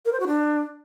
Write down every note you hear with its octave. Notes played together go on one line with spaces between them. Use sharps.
A#4
C5
F#4
D4